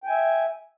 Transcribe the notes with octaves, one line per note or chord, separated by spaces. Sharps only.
E5 G5 G#5